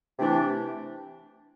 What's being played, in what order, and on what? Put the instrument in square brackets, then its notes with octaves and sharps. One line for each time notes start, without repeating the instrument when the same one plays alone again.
[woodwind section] C3 E3 A3 D4